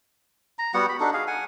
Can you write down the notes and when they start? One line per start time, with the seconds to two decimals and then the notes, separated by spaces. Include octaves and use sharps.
0.59 A#5
0.74 G3 B3 F#4 F#5
0.89 B5
1.00 D4 D#4 F#4 A4
1.14 G#4 F5
1.27 F#5 G#5